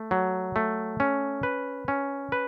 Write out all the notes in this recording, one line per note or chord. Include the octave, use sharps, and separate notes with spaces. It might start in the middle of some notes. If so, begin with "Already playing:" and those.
Already playing: A3
F#3
A3
C#4
B4
C#4
B4